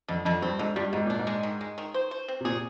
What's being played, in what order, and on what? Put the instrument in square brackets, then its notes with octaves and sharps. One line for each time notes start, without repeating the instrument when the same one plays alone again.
[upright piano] F2 [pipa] D3
[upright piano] F2 [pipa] D3
[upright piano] G2 [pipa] C4
[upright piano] G#2 [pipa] D3
[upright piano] G2 [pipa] G3
[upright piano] G#2 [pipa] D#3
[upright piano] A#2 [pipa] D4
[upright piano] G#2
[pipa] G#3
D#3
G#3
D#3
C5
C5
C4
[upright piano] C3
[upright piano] A#2 [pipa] G#4